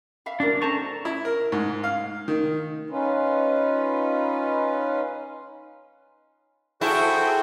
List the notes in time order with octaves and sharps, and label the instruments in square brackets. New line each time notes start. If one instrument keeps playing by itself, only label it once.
[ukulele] E5 F5 B5
[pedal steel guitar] D4 [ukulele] E4 F#4 A#4
[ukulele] C#4 A4 C5 [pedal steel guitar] A5 A#5 C#6
[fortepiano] E4
A#4
G#2
F5
D#3
[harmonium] C#4 D#4 F4 B4
[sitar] E4 [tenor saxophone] F#4 [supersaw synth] G#4 A4 G6 [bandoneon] C5 G5 C6